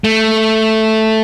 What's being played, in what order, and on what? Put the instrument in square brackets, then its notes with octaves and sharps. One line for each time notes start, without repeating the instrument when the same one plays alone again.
[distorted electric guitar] A3